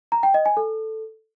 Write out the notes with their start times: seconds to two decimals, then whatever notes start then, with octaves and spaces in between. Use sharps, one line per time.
0.12 A#5
0.23 G5
0.34 D#5
0.46 G#5
0.57 A4